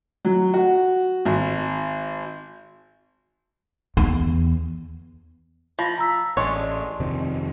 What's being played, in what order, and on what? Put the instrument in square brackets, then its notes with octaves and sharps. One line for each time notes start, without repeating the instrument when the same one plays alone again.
[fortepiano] F#3
F#4
G#1
[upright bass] E2
[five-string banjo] F3 [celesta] B5 A#6
[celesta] A#5 E6 B6
[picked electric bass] A1 [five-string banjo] G#3 D4 C#5 [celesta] D5 C6
[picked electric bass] F2 C3 D#3